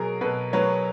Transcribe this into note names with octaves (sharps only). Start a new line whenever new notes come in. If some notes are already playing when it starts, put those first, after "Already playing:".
Already playing: B2 F#3 G#4 A#4
B2 A4 B4
F#3 B4 C#5